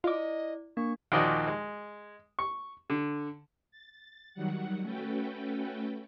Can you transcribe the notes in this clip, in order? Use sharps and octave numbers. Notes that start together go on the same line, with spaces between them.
E4 F4 D5 D#5 D6
A#3 D4 C#6
D#2 A#2 F3 F#4 D5 D#5
G#3
C#6
D3
A6
D#3 F#3 G3 F#5
A3 C#4 F#4 A4 B4 G5